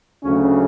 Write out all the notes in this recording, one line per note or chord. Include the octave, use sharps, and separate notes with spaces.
D2 C#3 F#3 C#4